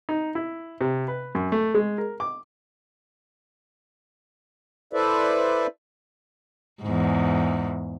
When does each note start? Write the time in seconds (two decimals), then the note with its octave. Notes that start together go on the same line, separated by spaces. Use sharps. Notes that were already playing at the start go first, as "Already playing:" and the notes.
0.09 D#4
0.35 E4
0.81 C3
1.08 B4
1.35 F#2
1.52 A3
1.75 G#3
1.98 A#4
2.20 D6
4.93 E4 A4 B4 C5 D5 E5
6.82 E2 G#2